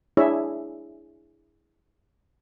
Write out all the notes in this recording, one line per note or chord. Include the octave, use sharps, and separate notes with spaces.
D4 E4 G#4 C#5 E5